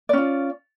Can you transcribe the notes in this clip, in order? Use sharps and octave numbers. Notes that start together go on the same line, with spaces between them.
C#4 F4 D5